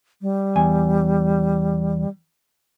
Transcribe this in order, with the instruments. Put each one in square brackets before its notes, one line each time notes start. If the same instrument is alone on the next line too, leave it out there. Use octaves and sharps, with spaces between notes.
[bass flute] G3
[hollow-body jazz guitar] E2 G#5